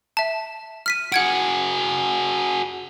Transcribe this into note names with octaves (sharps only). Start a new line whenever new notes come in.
E5 A5
F6 B6 D#7
F#4 G#4 F#5 G#6 D7